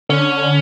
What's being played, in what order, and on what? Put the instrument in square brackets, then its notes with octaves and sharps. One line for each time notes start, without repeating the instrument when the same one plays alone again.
[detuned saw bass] D3 [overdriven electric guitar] C#4